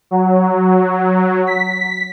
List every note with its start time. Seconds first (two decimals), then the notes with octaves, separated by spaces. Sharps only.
0.11 F#3
1.47 B6